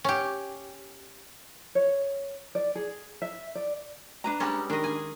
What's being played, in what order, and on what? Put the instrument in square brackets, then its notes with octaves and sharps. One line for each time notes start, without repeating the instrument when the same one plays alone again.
[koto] C#4 G4
[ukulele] C#5
D5
G#4
E5
D5
D4 B4 A#5
[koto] G3 G#3 C#4
[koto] D#3 D#5 [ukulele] D4
[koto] G#4 G#5